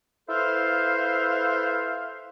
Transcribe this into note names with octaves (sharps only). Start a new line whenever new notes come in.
E4 A4 B4 C5 E5 F5